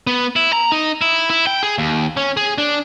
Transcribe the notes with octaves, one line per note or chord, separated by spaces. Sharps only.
B3
E4
A#5
D#4
E4
E4
G5
G#4
D#2
C#4
G#4
D4